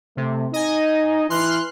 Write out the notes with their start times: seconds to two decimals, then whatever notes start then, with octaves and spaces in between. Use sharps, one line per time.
0.17 C3 A3
0.53 D#4 D#5 G#5
1.30 E3 C6 F6 F#6